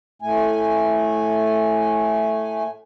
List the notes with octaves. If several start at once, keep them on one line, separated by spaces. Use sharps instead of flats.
A2 A3 G#5